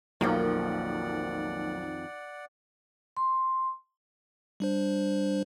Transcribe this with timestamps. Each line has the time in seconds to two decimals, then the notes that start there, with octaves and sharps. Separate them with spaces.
0.21 B1 F2 D#3 F3 A#3 D5 F#5
3.17 C6
4.60 G3 D4 C5